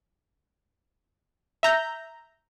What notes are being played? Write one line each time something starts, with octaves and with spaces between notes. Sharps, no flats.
E5 A#5 G6